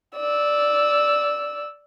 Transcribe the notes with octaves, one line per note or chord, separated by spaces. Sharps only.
D5 E6